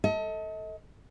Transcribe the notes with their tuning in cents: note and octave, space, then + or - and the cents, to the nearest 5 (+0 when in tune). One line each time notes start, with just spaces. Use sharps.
A4 +10 D#5 +40